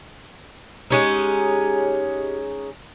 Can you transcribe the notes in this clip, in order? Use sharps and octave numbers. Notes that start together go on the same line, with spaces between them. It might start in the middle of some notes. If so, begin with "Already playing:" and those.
G#3 C#4 D#4 G4